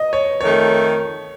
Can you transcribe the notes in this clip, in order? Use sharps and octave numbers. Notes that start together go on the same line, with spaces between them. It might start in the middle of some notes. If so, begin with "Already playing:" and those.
Already playing: D#5
C#5
F2 D#3 A3 C#5